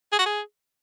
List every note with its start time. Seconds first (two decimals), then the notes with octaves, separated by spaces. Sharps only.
0.12 G#4
0.19 F#4
0.26 G#4